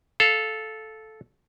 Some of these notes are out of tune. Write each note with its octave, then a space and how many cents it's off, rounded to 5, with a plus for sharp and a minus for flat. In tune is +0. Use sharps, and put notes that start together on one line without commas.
A4 -10 F5 +0